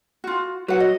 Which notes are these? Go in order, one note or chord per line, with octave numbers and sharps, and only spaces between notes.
F4 F#4
F#3 B4 F#5
D#5